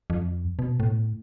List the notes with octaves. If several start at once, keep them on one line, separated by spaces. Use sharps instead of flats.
F2
B2
A2